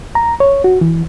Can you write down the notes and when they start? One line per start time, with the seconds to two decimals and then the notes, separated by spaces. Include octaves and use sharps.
0.15 A#5
0.40 C#5
0.64 F#4
0.81 E3